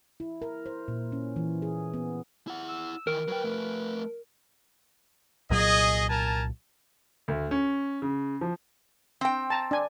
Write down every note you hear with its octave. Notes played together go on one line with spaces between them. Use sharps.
E4
A#4
C5
A#2
C#4
E3
G#4
B3
E4 F#5
E6
D#3 E3 A#4
F#3 B4 G5
F3 A3
C2 A#2 F#3 G#4 D#5
A#4 G#5 A5
D2
C#4
C#3
F3
C4 G5
A5 A#5
D4 G#5